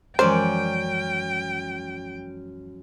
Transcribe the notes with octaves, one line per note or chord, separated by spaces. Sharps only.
F#2 E3 F3 G#3 C#4 C5 D5 G5